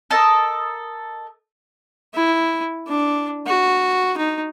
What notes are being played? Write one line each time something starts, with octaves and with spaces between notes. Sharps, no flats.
A4 A#4 D#5 A5
E4
D4
F#4
D#4